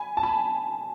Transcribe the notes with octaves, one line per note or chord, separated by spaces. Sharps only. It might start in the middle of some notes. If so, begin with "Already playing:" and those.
Already playing: G#5 B5
A5
G#5 B5